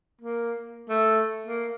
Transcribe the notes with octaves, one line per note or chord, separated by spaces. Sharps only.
A#3
A3
A#3